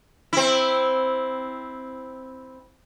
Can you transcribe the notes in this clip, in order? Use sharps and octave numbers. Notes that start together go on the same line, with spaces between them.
C4 E4